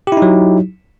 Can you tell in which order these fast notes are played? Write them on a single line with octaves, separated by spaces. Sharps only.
G4 E4 D#4 F#3